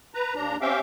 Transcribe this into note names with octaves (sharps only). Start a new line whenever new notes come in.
B4 A#5
D#2 D4 A#5
C4 C#4 G4 E5 F5 G5